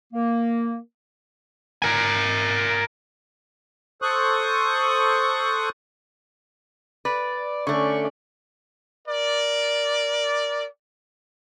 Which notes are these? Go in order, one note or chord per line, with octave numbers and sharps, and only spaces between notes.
A#3
A#4 G#5
A4 C5 C#6 D#6 F#6
B4 D5
D3 A3 C#4 D5 C#6
A#4 D5